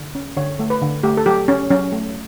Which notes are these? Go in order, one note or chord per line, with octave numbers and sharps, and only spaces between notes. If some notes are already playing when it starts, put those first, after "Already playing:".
Already playing: D3
C#4
D3 C#5
A3
B4
D3
A3 G4
A4
F#3 G4
C#4
F#3 C#4
A3